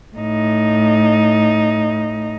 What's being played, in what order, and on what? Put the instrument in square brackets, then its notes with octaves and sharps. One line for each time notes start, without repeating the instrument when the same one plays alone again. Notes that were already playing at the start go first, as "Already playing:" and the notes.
[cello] A2 D#4